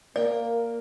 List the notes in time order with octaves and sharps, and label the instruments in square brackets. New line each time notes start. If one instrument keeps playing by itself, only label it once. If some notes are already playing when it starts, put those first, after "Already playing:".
[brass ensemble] A#3 [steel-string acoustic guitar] A#4 G5 [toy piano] D5